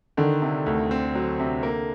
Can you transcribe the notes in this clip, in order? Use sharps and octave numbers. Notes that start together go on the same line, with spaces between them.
D3 D#3
C3
D2
C4
F#3
C3
A#3